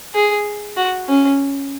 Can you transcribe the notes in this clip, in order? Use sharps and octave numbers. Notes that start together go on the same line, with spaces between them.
G#4
F#4
C#4